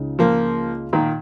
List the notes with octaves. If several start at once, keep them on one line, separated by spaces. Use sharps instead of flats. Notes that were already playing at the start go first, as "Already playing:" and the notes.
Already playing: C#2 C#3 D#4
F3 A#3
A#2 D#3